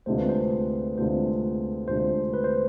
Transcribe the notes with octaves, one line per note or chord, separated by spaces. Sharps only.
D2 C3 G#3 D4 F4 C5
B4
C5
D2 C3 G#3 D4 F4 C5
D2 C3 G#3 D4 F4 C5
B4
C5